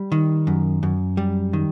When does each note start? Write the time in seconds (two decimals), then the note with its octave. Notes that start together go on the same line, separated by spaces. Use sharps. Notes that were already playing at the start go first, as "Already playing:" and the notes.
Already playing: G3
0.12 D#3
0.47 F#2
0.83 F#2
1.17 G3
1.53 D#3